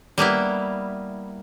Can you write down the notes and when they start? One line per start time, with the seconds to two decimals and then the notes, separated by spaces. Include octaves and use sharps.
0.18 G3 A#3 B3 E4